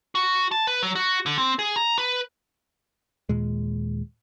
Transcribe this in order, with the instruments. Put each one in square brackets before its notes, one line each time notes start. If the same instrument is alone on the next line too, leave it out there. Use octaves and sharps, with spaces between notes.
[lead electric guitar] F#4
A5
B4
F#3
F#4
D3
C4
G#4
A#5
B4
[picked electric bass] D#2 A#2 G#3